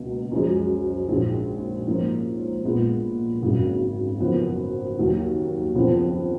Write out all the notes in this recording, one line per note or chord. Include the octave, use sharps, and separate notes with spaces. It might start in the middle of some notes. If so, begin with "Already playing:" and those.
Already playing: C#2 B2 A#3
F#2 F3 G#3
A#1 G#2 F3 G#3 C#4
G#2 F3 A#3 C#4 F4
A#1 A#2 G#3 B3 F4
G#1 F#2 C#3 F#3
F#1 F#2 F3 B3
D#2 D#3 F#3 A#3
F2 C#3 F3 B3 F4